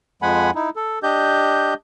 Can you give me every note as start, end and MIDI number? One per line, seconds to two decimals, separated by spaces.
0.22 0.51 41
0.22 0.51 53
0.22 0.51 56
0.22 0.51 78
0.22 0.51 80
0.22 0.51 83
0.55 0.70 63
0.55 0.70 64
0.76 0.99 69
1.03 1.74 62
1.03 1.74 67
1.03 1.74 75
1.03 1.74 91